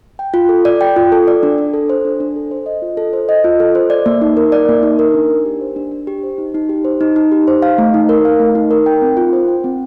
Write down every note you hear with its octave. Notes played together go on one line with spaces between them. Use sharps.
G5
F4
A4
D5
G5
F4
A4
D5
D4
D4
A4
C5
D4
D4
A4
C5
D#5
F4
A4
C5
D#5
F4
A4
C5
D5
A#3
D#4
A#4
D5
A#3
D#4
A#4
D4
D4
G4
C5
D4
D4
G4
C5
D#4
D#4
G4
C5
D#4
D#4
G4
C5
F5
A3
D#4
A#4
F5
A3
D#4
A#4
G5
C4
F4
C5
G5
C4